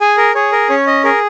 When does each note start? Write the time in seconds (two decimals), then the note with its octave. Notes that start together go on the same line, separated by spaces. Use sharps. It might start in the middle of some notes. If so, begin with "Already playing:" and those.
0.01 G#4 G#5
0.17 A#4
0.35 G#4 C#5
0.52 A#4
0.70 C#4 C#5
0.87 D#5
1.04 G#4 A#4